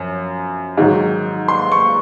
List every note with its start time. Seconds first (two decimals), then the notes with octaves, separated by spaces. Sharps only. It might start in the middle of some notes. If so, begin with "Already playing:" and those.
Already playing: F#2 F3
0.77 G#2 D#3 F#3
1.48 C6
1.72 C#6